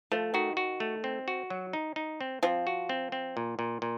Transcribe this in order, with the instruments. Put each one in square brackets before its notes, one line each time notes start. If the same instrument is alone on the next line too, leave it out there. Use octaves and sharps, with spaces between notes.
[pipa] F3 [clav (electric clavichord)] A3
[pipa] D#3 [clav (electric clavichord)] F#4
[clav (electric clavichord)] F#4
A3
C4
F#4
F#3
D#4
D#4
C4
[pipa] F3 [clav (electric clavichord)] C4
[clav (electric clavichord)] F#4
C4
C4
A#2
A#2
A#2